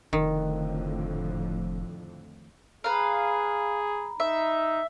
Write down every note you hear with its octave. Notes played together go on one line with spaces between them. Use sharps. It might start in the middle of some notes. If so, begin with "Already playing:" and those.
F1 F2 A2 D3 D#3
G#4 B4 F5 A#5 B5
D#4 E5